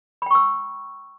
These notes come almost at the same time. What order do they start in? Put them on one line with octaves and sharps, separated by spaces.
B5 G5 C#6 E6